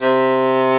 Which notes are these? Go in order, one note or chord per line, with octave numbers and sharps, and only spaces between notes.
C3